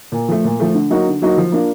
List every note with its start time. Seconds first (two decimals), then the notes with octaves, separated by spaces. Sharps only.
0.12 A#2
0.28 F3 A3
0.44 A#2
0.60 F3 A3
0.75 D3
0.90 F#3 A#3 D#4 F#4
1.07 D3
1.22 F#3 A#3 D#4 F#4
1.38 F3
1.52 A#3 D4 F4